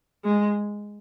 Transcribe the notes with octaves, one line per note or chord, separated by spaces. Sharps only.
G#3